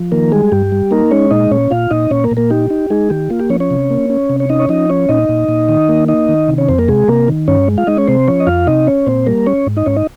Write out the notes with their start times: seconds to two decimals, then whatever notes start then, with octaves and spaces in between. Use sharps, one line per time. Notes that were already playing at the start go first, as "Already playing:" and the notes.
Already playing: F3
0.12 D#3 A#3 A#4
0.32 G3 G#3 G#4
0.52 G2 G4
0.72 G3
0.91 A#3 D#4 A#4
1.11 G#3 C#4 C#5
1.31 A#2 D#4 D#5
1.51 A#2 C#4 C#5
1.71 A#2 F4 F5
1.91 A#2 D#4 D#5
2.11 A#2 C#4 C#5
2.24 A#3 A#4
2.31 A#2
2.37 A#3 A#4
2.50 D#4 G4
2.70 D#4
2.90 G#3 D#4 G#4
3.10 D#3 G4
3.30 A#3 F4
3.40 G4
3.50 F3 C#4 C#5
3.60 C#4 C#5
3.71 C3
3.90 A#3
4.10 C#4
4.30 C3
4.40 C#5
4.50 C#4 D#4 D#5
4.60 C#5
4.69 F3 D#4 D#5
4.90 C#4 C#5
5.09 A#2 D#4 D#5
5.29 A#2
5.49 A#2
5.69 D#3
5.89 A#3
6.08 D#4 D#5
6.29 D#3
6.48 C3
6.58 C#4 C#5
6.68 F2 C4 C5
6.78 A#3 A#4
6.88 C3 G#3 G#4
7.08 C3 A#3 A#4
7.28 D#3
7.48 G2 C#4 C#5
7.68 G#3
7.78 F4 F5
7.87 G#3 D#4 D#5
7.97 C#4 C#5
8.08 C3 C4 C5
8.27 F3 C#4 C#5
8.40 D#5
8.47 F2 F4 F5
8.67 C3 D#4 D#5
8.87 C#4 C#5
9.06 A#2 C4 C5
9.26 G3 A#3 A#4
9.47 C#4 C#5
9.67 G#2
9.77 D#4 D#5
9.86 G#2 C#4 C#5
9.96 D#4 D#5